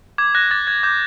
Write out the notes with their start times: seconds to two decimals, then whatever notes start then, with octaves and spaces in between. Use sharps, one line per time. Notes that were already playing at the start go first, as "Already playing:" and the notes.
0.18 D6 G#6
0.35 F#6 A#6
0.51 D6 A6
0.67 F#6 G#6
0.83 D6 G6